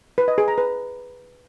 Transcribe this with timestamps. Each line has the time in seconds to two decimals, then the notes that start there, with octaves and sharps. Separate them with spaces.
0.18 B4
0.28 D#5
0.38 G#4
0.48 A#5
0.58 B4